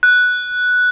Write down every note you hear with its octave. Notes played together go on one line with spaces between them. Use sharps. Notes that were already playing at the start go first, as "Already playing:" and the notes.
F#6